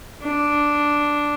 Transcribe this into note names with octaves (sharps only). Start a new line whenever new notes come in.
D4